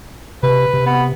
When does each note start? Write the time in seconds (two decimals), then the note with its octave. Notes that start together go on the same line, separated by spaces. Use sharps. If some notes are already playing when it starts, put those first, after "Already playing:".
0.43 C3 B4
0.74 C3
0.86 B3